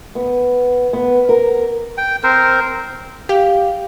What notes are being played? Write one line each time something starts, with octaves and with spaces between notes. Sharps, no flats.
B3
B3
A#4
G5
C4 A#4 C5
G4 F5